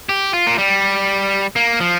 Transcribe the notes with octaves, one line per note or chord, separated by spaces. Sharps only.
G4
F4
A#3
G3
A#3
F3